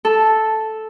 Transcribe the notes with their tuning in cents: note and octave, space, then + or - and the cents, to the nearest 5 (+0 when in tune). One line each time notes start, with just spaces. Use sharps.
A4 -5